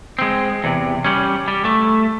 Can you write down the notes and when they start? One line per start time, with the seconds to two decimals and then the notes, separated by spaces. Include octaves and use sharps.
0.19 G#3 C4
0.64 E2 C3
1.04 G3 C#4
1.48 G3
1.65 A3